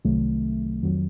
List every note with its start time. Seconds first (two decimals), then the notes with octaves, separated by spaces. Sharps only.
0.04 C2 C3 D#3 F#3 A3
0.83 F2 D#3 F#3